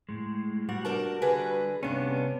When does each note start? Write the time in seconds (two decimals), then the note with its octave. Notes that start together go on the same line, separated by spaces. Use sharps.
0.09 A2 G#3
0.69 G3 F#4 F#5
0.85 D4 A#4 A5
1.22 D3 G#4 B4
1.83 G2 C3 B3 C#4 D4